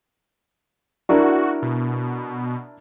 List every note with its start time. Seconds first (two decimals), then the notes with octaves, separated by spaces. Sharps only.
1.09 D4 E4 F#4 A#4
1.62 B2